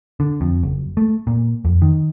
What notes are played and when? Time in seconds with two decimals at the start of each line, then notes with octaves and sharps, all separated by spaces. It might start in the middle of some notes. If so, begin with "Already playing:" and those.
0.20 D3
0.41 F2
0.63 F#1
0.97 A3
1.27 A#2
1.65 F2
1.82 D#3